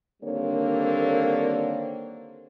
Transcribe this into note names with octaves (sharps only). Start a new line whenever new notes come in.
D3 D#3 G3 A#3 C4 C#5